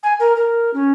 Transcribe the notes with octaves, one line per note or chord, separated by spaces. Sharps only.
G#5
A#4
A#4
C#4